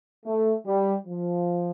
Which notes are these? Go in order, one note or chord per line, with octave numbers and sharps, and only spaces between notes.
A3
G3
F3